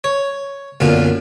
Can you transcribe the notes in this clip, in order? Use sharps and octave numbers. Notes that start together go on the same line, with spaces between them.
C#5
B1 F#2 A#2 D3 F4